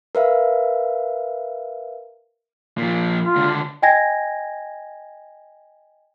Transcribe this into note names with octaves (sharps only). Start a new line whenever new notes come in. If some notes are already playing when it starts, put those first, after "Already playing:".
A#4 B4 E5 F5
A#2 F3
F4
C#2 D3
D#5 G5 G#5 G#6 A#6